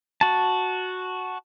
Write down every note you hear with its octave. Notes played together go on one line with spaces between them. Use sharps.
F#4 A5